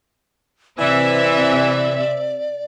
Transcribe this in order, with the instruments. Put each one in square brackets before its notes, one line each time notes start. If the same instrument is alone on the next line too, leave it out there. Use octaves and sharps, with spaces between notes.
[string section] C3 [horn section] E3 [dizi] D5 [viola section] E5